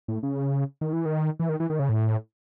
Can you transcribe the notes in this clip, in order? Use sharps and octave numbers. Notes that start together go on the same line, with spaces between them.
A2
C#3
D#3
E3
D#3
E3
D#3
E3
D#3
C#3
A2